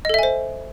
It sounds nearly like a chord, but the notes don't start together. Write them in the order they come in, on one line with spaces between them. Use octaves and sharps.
D#5 A4 E5 G#5 C5